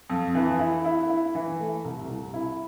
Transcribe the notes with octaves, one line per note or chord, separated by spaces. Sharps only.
F2
E3
E4
E4
E4
E3
A3
C2
C2
E4